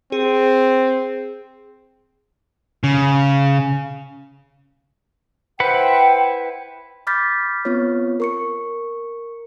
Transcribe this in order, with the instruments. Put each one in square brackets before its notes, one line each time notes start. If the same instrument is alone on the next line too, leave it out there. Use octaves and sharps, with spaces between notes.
[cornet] C4 [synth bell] G#4
[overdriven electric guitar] C#3
[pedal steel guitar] E4 B4 F#5 [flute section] C5 G5
[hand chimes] B5 D6 F6 G6 A6 B6
B3 C4 F4 C#5
A#4 C#6 C#7